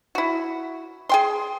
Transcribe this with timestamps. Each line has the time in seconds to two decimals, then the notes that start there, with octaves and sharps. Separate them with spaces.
0.15 E4 F#4
1.09 G#4 G5 C6